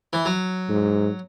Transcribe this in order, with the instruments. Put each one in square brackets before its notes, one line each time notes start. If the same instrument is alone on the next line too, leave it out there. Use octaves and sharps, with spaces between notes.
[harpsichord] E3
F#3
[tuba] G#2